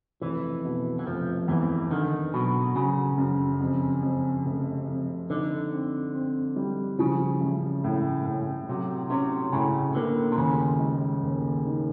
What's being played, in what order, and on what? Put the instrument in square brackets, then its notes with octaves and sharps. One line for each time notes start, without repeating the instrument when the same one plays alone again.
[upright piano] F1 [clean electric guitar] E3
[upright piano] B2
[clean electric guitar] E3
[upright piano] F1 [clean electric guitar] F3
[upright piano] E2 [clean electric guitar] E3
[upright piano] D3 [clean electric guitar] D#3
[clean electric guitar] B2 [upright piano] F#3
[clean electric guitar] C#3 [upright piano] F#3
[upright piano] F#2
F2
F2
F1
F2
[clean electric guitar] D3 [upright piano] D#4
[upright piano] C4
C4
G3
[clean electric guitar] C#3 [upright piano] F3
[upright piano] A1
A2
A2
[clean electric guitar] C3 [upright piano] F#3
[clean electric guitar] C3 [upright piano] C#4
[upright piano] A2 [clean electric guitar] C#3
[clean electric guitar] D3 [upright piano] A#3
[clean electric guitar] C3
[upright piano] D#2 [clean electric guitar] C#3
[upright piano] G#3
D#2
D#3